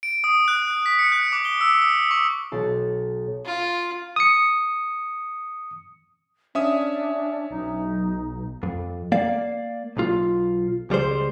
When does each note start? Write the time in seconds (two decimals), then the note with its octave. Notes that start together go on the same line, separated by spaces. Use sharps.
0.03 D7
0.24 D#6
0.48 F#6
0.86 B6
0.99 C#7
1.12 F#6
1.33 D6
1.45 G7
1.61 E6
1.82 D#6
2.11 C#6
2.52 B1 A5 C7
3.45 F4
4.16 D#6 C#7
6.55 C#4 D4 E5 D#6
7.50 B1 D#4
8.63 F2
9.12 A#3 D5 F5
9.97 B1 F4
10.90 C#2 G3 G#3 C5